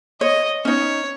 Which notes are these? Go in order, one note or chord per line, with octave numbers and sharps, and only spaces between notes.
C#5 D#5
C#4 D#4 C#5